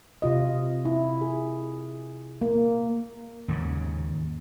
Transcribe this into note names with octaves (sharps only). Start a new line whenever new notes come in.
C3 F4 D#5
E4
G#4
A#3
D#2 G#2 C#3